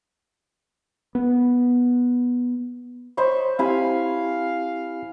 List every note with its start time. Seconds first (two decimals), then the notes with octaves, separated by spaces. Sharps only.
1.15 B3
3.17 C5 C#5 D#5 B5 C#6
3.59 C4 E4 G4 F5 G#5 B5